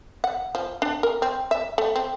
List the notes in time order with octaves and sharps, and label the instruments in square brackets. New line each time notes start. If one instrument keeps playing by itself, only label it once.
[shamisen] F#5
F3
D4
A#4
C4
E5
A3
C4